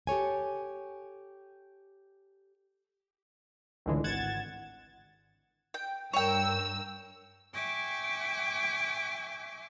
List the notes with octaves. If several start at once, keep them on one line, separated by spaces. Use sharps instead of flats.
G4 A4 C#5 G#5
C#2 A2 D3 E3 G#3
G#1 F#5 G#6 A6 E7
G5
G2 A#4 C#5 G5 E6
E5 G5 G#5 C#6 D6